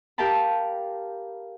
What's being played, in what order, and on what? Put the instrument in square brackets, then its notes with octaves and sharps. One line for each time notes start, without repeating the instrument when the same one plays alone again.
[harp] G4 A#4 F5 G5 A5 B5